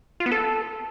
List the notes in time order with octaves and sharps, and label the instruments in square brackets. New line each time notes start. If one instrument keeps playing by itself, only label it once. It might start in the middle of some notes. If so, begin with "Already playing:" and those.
[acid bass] F4
B3
A4